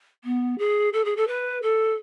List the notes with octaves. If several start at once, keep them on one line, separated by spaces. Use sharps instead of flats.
B3
G#4
A4
G#4
A4
B4
A4